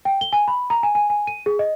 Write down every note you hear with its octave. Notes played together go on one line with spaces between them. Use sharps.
G5
G7
G#5
B5
A#5
G#5
G#5
G#5
D#7
G#4
D#5